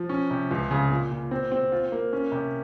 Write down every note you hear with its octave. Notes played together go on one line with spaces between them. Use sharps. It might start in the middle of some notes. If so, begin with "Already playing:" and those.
Already playing: F3
C#4
C3
C#2
C#3
A#2
A#2
C4
C4
F4
A#3
C#4
C3